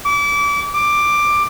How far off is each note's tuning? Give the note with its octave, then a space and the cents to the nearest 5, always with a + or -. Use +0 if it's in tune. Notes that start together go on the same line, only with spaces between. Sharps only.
D6 -30
D6 +10